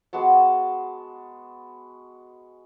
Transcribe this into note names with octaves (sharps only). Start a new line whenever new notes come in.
G#3 B3 F#4 A5